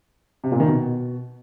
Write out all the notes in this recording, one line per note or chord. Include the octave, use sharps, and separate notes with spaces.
C3
A#2
D#3
B2